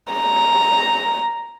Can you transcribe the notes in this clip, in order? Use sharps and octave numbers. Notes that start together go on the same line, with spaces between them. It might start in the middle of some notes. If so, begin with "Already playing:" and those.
A#5